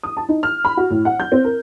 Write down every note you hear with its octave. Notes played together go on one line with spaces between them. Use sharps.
D#6
A5
D#4
F6
B5
F#4
A2
F#5
G6
C4
A#4